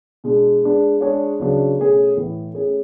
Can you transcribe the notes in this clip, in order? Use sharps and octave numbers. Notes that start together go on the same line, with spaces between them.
B2 G#3 D4
G#3 B3 D4
G#3 D4 G#4 C#5
C#3 F#3 B3 D4
B2 A3 C#4 G#4
A2 E3 B3
A3 C#4 G#4